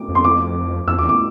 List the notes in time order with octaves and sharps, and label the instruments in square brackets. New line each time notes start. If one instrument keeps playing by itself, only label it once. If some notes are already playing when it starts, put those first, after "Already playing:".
Already playing: [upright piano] D6
[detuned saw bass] F2
[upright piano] C6
D6
[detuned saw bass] F2 [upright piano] E6
[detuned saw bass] E2 [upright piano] D6
[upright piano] D6